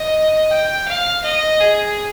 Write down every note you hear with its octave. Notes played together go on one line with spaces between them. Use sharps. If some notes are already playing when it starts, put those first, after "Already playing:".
Already playing: D#5
G5
F5
D#5
G#4